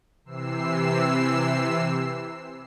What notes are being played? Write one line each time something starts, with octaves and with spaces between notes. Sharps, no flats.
C3 E3 E6 C7